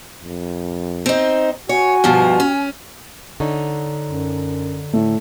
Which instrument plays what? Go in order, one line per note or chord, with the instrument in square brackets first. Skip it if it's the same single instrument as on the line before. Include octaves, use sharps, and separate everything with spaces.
[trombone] F2
[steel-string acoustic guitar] C4 D#4
[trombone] F#4 [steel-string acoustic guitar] C#5 [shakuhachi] G#5
[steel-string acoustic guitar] G2 B2 F3
C#4
D3 D#4 C#5
[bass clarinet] F#2
[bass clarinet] A2 [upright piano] A3